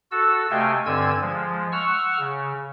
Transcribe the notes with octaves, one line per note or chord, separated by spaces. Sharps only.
F#4 A4 E6
C3 A3 D#5 F5 G5 G#5
G2 D3 C4 G#5 E6 G#6
F3 G#3
F#5 C#6 E6 F6
C#3